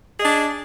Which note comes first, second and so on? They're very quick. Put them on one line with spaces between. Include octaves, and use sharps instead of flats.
G#4 D#5 D4